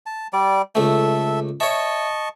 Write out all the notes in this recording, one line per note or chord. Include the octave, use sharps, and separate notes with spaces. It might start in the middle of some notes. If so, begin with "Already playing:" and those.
A5
G3 D5
C#2 A3 A4 E5
C#5 D#5 E5 A5 C#6